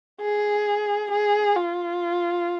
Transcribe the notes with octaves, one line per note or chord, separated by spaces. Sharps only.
G#4
G#4
F4